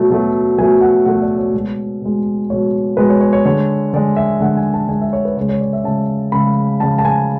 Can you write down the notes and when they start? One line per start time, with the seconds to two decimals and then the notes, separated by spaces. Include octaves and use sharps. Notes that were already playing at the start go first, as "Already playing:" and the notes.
Already playing: B2 F#3 A3
0.10 B2 F#3 A3
0.58 B2 F#3 A3 G#5
0.81 F#5
1.05 B2 F#3 A3 F#5
1.22 D5
1.38 C#5
1.53 B2 G#3
2.02 B2 G#3
2.50 B2 G#3 C#5
2.97 B2 G#3 B4
3.09 C#5
3.21 C#5
3.33 C#5
3.45 D3 G#3 C#5
3.94 D3 G#3 D5
4.17 E5
4.41 D3 G#3 F#5
4.57 G#5
4.74 A5
4.88 D3 G#3 G#5
5.01 E5
5.13 C#5
5.25 B4
5.37 C#3 C#5
5.41 G#3
5.49 C#5
5.61 D5
5.73 E5
5.84 C#3 G#3 A5
6.32 C#3 G#3 B5
6.80 C#3 G#3 A5
6.98 A5
7.05 G#5